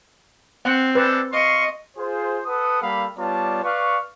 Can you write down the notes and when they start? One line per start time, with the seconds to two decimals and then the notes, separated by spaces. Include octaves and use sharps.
0.65 C4 F#5
0.95 G#3 D4 A4 B4 C5
1.33 D#5 F5 C6 C#6
1.97 F4 G#4 C5
2.45 A4 B4 F#5 D#6
2.81 G3 A#3 A4 F5 B5
3.18 G3 B3 F4 C#5 D5 A5
3.64 B4 D5 F5 C#6